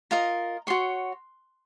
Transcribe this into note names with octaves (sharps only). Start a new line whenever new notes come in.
F4 A#4 D#5 A#5
F#4 C#5 C6